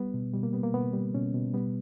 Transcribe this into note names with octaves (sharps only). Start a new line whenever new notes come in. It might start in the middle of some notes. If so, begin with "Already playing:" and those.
Already playing: G3 B3
B2
B2 G3
A#3
G3 B3
A#3
B2 B3
G3
B2 C#4
B2
G3 B3